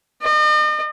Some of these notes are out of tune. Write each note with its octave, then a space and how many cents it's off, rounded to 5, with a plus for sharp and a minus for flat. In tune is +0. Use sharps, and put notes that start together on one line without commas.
D#5 -40